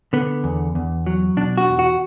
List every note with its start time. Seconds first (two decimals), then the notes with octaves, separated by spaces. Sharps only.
0.13 D3 B3
0.44 E2
0.75 E2
1.06 F#3
1.37 B2 D4
1.57 F#4
1.69 E2
1.79 F#4